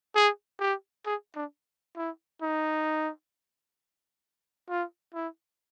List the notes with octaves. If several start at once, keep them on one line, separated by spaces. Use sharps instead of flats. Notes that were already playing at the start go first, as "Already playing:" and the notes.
G#4
G4
G#4
D4
E4
D#4
F4
E4